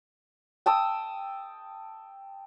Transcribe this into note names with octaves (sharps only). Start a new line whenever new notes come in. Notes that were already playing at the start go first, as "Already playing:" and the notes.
G5 A5 D#6 E6